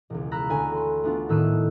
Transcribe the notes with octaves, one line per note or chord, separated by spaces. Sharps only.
E1 C#2
A#5 B5 E6 F#6 A#6 B6
D2 G#5
C6
A3 B3 D4 F4
A2 D#3 E6 F#6 D#7